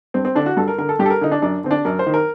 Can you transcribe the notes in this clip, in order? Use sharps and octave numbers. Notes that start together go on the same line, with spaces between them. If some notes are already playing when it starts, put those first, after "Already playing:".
G2 C4
C4
D3 D4
F#4
G2 A4
A#4
D3 A#4
A4
G2 G4
A4
A#4
D3 D#4
D4
F#2 D4
D3 C4
D4
F#2 A#4
C5
D#3
A#4